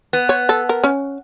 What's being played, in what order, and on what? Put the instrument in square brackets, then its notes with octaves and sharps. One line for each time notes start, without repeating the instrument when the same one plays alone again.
[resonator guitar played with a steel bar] B3
[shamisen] C#5
A4
A#4
C#4